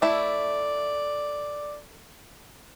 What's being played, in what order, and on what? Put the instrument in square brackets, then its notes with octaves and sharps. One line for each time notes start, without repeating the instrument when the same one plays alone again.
[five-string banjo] A3 E4 [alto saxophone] D5